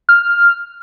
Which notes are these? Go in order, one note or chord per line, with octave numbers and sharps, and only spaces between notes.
F6